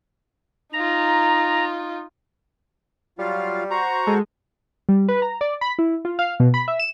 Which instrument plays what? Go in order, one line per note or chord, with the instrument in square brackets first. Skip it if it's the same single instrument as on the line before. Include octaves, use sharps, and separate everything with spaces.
[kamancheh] D#4 F4 [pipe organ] A#5
[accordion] F#3 F4 F5 [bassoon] G3
[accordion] F#4 C5 C#6 [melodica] A#5
[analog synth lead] G#3 [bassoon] A4
[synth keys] G3
B4
A#5
D5
B5
E4
F4
F5
B2
B5
E5
E7